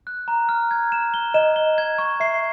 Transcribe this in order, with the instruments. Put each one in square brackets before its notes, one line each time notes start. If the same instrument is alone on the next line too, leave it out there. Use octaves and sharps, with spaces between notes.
[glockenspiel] F#6
A#5
F6
G#6
E7
G7
[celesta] D#5 [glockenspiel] E7
[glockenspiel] G7
G#6
C#6
[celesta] E5 [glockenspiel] C7